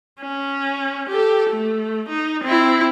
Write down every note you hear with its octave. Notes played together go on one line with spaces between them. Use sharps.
C#4
G4 A4
A3
D#4
C4 E4